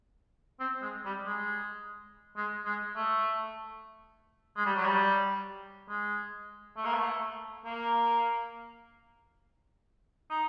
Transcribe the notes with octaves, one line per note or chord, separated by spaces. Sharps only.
C4
G#3
G3
G#3
G#3
G#3
A3
G#3
G3
F#3
G3
G#3
A3
A#3
A3
A#3
D#4